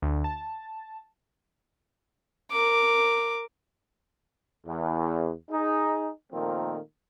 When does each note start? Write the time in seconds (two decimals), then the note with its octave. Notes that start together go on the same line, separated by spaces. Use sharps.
0.02 D2
0.24 A5
2.51 A#4 D6
4.67 E2
5.51 D#4 G#4
6.32 A#2 D#3 F3 A3 A#3 C4